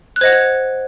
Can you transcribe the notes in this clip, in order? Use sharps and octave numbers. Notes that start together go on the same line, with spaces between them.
F#6
C5 D#5 F#5 G#6